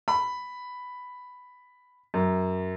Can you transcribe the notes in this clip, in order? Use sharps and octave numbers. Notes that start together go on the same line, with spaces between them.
B5
F#2